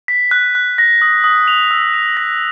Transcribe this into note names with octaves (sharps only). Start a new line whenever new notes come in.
B6
F#6
F#6
A#6
D#6
D#6
F7
E6
F7
A#6